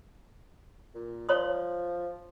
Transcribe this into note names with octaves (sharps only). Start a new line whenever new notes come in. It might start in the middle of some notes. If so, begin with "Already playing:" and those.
A#2
F3 C#5 C6 D#6